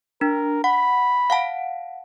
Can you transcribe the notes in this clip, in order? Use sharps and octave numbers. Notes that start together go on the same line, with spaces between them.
D4 A#4
F#5 B5
F5 F#5 A5